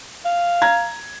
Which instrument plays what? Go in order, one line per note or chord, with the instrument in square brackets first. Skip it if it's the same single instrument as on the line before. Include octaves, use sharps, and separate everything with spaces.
[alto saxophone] F5
[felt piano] A#5 G#6